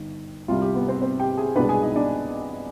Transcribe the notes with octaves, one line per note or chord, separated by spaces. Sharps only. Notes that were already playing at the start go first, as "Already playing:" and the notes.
Already playing: G1 D#3
C2 C3 G3 F4
G4
B3 B4
C4 C5
C4 C5
G4 G5
G#4 G#5
C2 B2 G#3 B3 D4 B4 B5
G#4 G#5
D#4 D#5
D4 D5